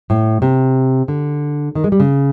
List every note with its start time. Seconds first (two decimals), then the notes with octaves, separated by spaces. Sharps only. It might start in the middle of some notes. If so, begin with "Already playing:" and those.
0.10 A2
0.42 C3
1.08 D3
1.75 D#3
1.84 G#3
1.92 G3
2.00 C#3